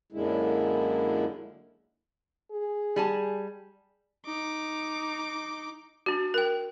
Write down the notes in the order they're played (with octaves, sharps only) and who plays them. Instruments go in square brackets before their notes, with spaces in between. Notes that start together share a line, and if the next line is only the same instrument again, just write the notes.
[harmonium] F#2 A#2 D3 G#3 E4
[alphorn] G#4
[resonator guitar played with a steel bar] G3 G#5 A5
[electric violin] D#4 D6
[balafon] D4 F#4
A#4 G5